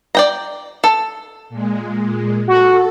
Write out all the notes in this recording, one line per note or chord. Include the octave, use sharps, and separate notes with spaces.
D5 G5 A#5
A4
A#2 G#3
F#4 A4